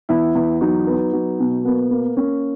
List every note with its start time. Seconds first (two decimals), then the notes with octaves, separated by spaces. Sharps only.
0.09 E2 E4
0.35 E2
0.61 F#3 D#4
0.87 B3
1.13 F#3
1.39 B2
1.64 A#3 B3
1.91 A#3
2.17 A#3 C#4